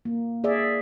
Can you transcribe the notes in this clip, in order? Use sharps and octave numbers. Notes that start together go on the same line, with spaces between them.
A#3
G#4 D5 E5